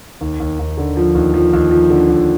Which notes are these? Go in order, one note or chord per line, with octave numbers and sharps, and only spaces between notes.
D#2
D#2
D#2
D3
F3
D#2
F3
D#2
F3
D3
D#2